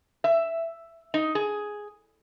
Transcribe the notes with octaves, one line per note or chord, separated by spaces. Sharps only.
E5
D#4
G#4